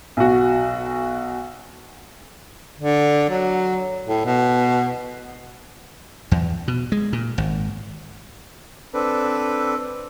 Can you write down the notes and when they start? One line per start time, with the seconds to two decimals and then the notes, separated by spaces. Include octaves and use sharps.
0.17 B1 F#4
2.79 D3
3.29 F#3
4.06 A2
4.25 B2
6.31 E2
6.68 B2
6.92 G#3
7.13 A#2
7.38 G#1
8.94 C4 D4 A4 B4